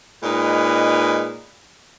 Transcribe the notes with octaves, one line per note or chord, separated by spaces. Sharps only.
A#2 G#3 D#4 B4